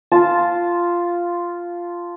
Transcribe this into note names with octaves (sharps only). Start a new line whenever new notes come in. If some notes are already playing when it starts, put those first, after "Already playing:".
F4 A5